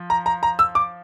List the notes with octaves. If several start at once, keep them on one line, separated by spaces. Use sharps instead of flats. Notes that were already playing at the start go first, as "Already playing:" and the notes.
Already playing: F3
A#5
A#5
A#5
E6
D6